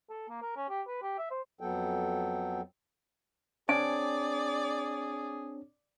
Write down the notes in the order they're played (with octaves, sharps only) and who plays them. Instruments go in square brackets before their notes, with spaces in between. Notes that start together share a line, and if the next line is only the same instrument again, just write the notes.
[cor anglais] A4
A#3
A#4
C#4
G4
B4
G4
E5
C5
[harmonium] F2 F#3 B3 A4 G5
[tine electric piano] C4 D4 C#5 [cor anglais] G#4 [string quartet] D5 [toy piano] G#5